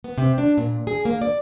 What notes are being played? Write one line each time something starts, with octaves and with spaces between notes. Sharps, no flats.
B3
C3
D4
A#2
G#4
A#3
D5